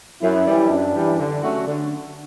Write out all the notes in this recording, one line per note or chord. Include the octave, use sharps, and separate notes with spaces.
F#2 E4
E3 G3
F#2 D4
E3 G3
D3
F#3 A3 C#4 F#4
D3